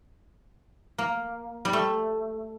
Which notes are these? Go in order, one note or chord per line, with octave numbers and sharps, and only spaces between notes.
A#3
G3
A3